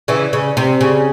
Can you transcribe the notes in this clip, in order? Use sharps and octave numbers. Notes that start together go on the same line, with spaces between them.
C#3 E3
C#3
C3
C#3